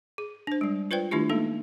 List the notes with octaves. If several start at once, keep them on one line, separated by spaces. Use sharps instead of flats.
G#4
D4 C5
G3 G#3
F4 B4 C5 D5 G5
D#3 A3 D4 E4 F4 G4
G#3 A#3 D#4 A4